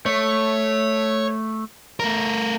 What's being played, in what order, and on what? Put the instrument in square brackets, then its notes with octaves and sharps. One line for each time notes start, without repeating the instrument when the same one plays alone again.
[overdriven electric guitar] A3 [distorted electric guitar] C#5
[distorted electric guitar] A3 A#4